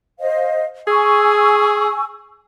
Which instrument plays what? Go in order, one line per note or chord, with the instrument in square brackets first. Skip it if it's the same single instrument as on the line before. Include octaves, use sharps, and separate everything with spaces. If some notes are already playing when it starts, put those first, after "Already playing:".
[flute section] C5 D#5 F5
[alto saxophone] G#4 [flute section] G#5 C#6 E6